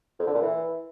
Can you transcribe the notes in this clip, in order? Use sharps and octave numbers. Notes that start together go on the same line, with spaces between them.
F2
D3
A#2
E3